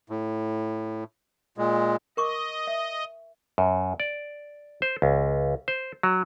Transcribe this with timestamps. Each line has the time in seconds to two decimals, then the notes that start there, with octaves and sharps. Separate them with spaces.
0.10 A2
1.58 A#2 G#3
2.17 A#4 D#5 C#6 D6
2.67 E5
3.58 F#2
4.00 D5
4.82 C5
5.02 C#2
5.68 C5
6.03 F#3